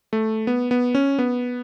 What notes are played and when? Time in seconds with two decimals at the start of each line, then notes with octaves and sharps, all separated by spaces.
0.13 A3
0.47 B3
0.71 B3
0.95 C#4
1.19 B3